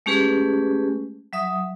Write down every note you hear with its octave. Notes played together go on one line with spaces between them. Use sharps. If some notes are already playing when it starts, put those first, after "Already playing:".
G#3 A3 C#4 G4 G#4 B4
F#3 E5 D#6